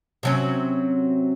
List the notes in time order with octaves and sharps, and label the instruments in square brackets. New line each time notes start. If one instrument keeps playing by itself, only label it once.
[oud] C3 F#3 C#4